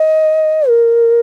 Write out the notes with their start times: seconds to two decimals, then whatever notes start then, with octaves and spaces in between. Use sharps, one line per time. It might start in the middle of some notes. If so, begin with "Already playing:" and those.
Already playing: D#5
0.69 A#4